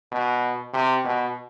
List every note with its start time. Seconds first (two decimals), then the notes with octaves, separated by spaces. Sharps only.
0.12 B2
0.73 C3
1.04 B2